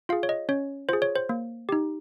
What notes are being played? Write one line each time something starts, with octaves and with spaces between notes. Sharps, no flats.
F4 G#4 F5
C#5
D#5
C#4 C#5
F4 G#4 C5
C#5
C5
A#3
D#4 G4